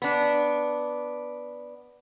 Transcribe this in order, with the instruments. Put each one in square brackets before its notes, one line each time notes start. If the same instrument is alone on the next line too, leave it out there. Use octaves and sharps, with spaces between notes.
[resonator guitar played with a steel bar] B3 D4